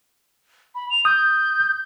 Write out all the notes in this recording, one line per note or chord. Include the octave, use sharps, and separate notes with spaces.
B5
F7
D#6 G6